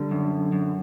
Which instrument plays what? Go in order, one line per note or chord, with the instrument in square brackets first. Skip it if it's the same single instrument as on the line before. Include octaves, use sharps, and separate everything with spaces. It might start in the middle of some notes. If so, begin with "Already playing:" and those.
Already playing: [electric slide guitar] D3 G3
F#2
F#2